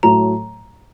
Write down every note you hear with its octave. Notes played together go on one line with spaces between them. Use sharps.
A2 F#3 A3 A#5